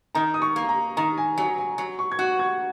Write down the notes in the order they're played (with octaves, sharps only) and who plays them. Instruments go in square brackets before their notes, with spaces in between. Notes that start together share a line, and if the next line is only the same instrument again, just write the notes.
[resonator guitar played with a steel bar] D#3 [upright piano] A#5
[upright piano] D#6
C#6
[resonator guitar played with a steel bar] A#3
[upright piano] A#5
[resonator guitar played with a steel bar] D#3 [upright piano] A#5
[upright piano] G#5
[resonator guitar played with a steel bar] F#3 [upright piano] G#5
[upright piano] G#5
[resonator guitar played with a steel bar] F#3
[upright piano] C#6
G#6
[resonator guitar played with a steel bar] F#4 [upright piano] F#6
[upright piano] G#6